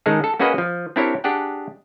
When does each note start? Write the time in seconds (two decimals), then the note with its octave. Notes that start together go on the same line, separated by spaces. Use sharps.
0.06 D#3 G#3 C#4 D#4 G#4 A4
0.24 A4
0.39 A#3 C#4 F#4 G#4 B4 D#5
0.58 F3
0.96 C4 D4 E4 G4 A#4 C#5
1.24 D4 G4 G#4 F#5 G5